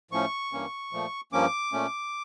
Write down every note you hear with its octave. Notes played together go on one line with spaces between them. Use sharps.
A2 F3 A3 C#4 C#6
G2 E3 A#3 C#4
A#2 F3 A3
G2 F3 A#3 C#4 D6
A#2 A3 C#4